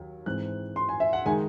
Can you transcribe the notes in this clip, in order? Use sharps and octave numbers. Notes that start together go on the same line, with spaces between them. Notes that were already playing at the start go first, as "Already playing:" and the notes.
Already playing: D#2 F#3
G#2 E3 C4 F#6
C6
G#5
E5
F#5
D#3 G#3 G#5